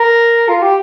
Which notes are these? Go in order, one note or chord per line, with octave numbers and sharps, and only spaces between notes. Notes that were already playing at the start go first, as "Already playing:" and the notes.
Already playing: A#4
F4
G4